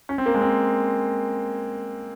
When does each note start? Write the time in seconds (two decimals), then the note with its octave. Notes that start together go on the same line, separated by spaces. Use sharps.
0.09 C#4
0.18 C4
0.26 A#3
0.35 G#3
0.42 C4